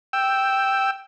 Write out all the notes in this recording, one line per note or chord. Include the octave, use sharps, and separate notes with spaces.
G5 E6